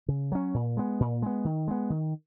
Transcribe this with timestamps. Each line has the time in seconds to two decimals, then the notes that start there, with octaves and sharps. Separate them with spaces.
0.08 C#3
0.32 F#3 C#4
0.54 A#2
0.77 G#3 B3
1.00 A#2
1.22 G#3 B3
1.45 D#3
1.68 G#3 B3
1.90 D#3